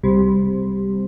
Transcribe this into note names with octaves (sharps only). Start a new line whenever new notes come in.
C2 C3